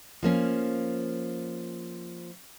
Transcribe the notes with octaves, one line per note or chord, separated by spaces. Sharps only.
F3 A#3 C#4